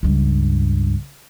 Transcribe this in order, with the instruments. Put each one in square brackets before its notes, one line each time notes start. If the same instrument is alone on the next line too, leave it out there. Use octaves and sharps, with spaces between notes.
[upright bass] C#2 G2